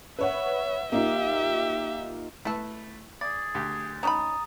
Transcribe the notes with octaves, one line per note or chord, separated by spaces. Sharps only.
B4 C#5 E5 F#5
A#3 D#4 F4 G4 E5
A3 E4 A4 B4
G#4 D5 A6
D2 G4
C#4 D#4 A#5 B5 D#6